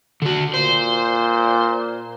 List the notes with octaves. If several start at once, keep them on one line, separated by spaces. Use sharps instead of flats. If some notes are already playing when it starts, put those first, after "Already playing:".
D3 F#4
A#2 C5